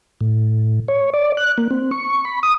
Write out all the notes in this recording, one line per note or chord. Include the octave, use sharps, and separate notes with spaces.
A2
C#5
D5
F#6
A#3
C4
C#6
B5
D#6